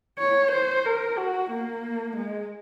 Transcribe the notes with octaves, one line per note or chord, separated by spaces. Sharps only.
C#5
C5
A#4
F#4
A#3
G#3